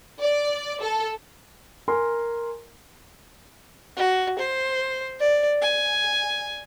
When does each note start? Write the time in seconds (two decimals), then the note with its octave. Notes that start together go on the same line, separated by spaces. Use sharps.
0.20 D5
0.80 A4
1.88 A#4 G#5 C6
3.97 F#4
4.39 C5
5.20 D5
5.62 G#5